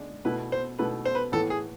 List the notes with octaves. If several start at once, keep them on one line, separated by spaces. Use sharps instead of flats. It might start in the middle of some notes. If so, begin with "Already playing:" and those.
Already playing: D3 G#3 D4
B2 A3 E4 B4
C5
B2 A3 E4 B4
C5
B4
A2 E3 B3 A4
G#4